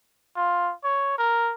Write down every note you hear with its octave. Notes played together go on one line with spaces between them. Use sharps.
F4
C#5
A#4